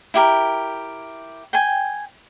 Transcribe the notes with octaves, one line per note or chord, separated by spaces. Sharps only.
E4 G4 A#4
G5 G#5